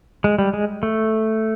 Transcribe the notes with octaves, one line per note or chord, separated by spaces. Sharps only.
G#3
G3
G#3
A3